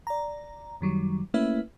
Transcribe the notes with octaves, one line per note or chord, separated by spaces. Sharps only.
D5 A#5
F#2 D#3 F#3 G3
A3 A#3 C#4 E4 B4 E5